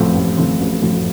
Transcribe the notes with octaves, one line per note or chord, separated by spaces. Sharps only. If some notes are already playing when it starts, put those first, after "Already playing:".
Already playing: A1 A2 F3 A3 C4
A1
A2 F3 A3 C4
A1
A2 F3 A3 C4